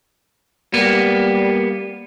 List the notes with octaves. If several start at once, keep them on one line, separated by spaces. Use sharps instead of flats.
G3 A#3 B3